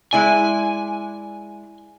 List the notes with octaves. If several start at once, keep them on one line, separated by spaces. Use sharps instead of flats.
G#3 E4 D5 G#5